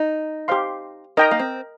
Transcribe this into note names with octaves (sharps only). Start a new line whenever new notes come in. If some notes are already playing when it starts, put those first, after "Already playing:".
Already playing: D#4
G4 C5 F5 C6
D#4 A#4 D#5 G5 A#5
A#3
C4